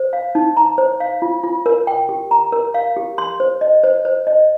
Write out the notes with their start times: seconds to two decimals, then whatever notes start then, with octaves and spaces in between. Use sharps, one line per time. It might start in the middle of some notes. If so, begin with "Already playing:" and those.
Already playing: C5
0.13 F5
0.35 D#4
0.57 A#5
0.78 C5
1.00 F5
1.22 F4
1.43 F4
1.66 A#4
1.87 G5
2.09 G4
2.31 A#5
2.52 A#4
2.74 F5
2.97 G4
3.18 C6
3.40 C5
3.61 D#5
3.84 C5
4.05 C5
4.27 D#5